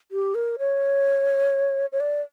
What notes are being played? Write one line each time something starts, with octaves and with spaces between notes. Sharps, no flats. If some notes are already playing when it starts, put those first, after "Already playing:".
G4
A#4
C#5
C#5
D5